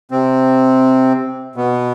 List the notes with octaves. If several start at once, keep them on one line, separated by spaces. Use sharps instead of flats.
C3 C4
B2 B3